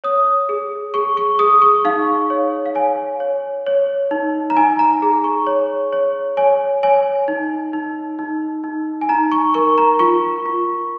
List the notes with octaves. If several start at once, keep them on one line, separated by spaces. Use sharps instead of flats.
C#5 D#6
G#4
G#4 C#6
C#6
G#4 D#6
C#6
D#4 F5
C#5
F5
C#5 G#5
C#5
C#5
D#4
A#5
D#4 G#5
A#5
G#4 A#5
C#6
C#5
C#5
C#5 G#5
C#5 G#5
D#4
D#4
D#4
D#4
G#5
D#4 A#5
C#6
A#4 C#6
A#5
F4 C#6
F4